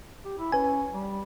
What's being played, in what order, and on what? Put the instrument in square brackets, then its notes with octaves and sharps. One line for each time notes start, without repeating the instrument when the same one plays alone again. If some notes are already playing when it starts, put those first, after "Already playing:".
[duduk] G4
E4
[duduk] C#4 [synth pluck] B4 G#5
[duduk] G3